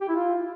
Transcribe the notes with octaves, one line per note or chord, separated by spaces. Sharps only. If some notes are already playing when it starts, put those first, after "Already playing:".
G4
E4
F4